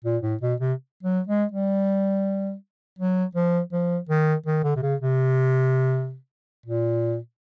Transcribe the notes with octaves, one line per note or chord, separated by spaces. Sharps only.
A#2
A2
B2
C3
F#3
G#3
G3
F#3
F3
F3
D#3
D#3
D3
C3
C#3
C3
A#2